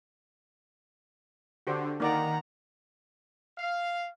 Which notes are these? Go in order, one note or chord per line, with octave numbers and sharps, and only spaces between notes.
D3 F#4 G4 C5
D#3 A#3 D5 F#5 A#5
F5